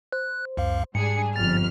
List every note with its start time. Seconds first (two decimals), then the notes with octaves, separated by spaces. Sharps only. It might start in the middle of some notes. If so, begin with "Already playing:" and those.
0.12 C5 F#6
0.57 C#2 F#2 F5
0.95 G#2 G3 D4 G#4 C#7
1.36 G1 F2 F6 A6